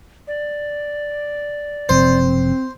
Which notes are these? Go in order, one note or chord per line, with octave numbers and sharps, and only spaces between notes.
D5
F#1 C3 F3 C4 C5